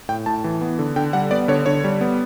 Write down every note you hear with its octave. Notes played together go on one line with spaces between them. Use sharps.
A2 G5
A2 A5
E3
B3
D3
D3 G5
G3 F#5
B3 D5
D3 C#5
D3 C#5
G3
B3